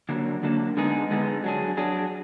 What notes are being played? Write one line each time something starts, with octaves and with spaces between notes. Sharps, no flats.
D3 F#3 A#3 D4
D3 F#3 A#3 D4
D3 G#3 B3 D#4 G#4
D3 G#3 B3 D#4 G#4
F#3 D4 G#4
F#3 D4 G#4